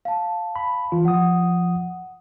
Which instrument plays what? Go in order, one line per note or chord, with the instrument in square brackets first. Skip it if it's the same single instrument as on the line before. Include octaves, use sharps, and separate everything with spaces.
[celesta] F5 A5
[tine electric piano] B5
E3 F4
[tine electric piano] F3 D#6 [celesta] F#5